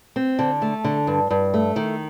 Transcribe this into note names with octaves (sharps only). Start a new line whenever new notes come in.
C4
D3
A3
D3
G2
G2
A3
D#3